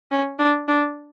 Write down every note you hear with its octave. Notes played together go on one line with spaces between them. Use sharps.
C#4
D4
D4